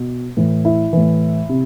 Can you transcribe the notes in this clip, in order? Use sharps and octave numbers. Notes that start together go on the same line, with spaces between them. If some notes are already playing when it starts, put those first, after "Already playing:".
Already playing: B2
A2 E3
E4
A2 E3
C3